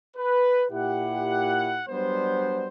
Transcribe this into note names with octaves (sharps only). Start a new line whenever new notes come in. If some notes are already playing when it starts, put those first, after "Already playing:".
B4
A#2 E4 G4 F#5
F#3 G3 B3 D4 C5